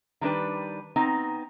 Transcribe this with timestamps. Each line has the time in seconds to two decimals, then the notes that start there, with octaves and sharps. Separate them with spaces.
0.21 D#3 G3 D4 B4
0.96 B3 C4 D#4 A#5